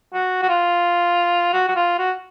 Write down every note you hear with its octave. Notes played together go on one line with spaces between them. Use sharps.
F#4
F#4
F4
F#4
F#4
F4
F#4